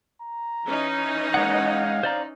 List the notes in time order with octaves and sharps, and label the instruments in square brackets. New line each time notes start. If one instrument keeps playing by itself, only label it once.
[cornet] A#5
[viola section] E3 C#4 D#4
[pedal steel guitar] G#3 F#5 [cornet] A#3
[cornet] F5
[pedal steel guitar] C5 D5 A#5